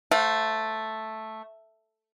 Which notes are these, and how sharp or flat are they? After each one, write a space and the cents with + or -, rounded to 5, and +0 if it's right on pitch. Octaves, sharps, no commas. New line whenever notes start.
A3 +0 C5 -15 F5 +40